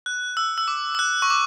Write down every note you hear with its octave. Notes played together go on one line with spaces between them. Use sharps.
F#6
E6
E6
D6
E6
F#6
C#6
D6